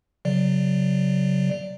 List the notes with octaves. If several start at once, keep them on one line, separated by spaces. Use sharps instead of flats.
C#3 F#3 D5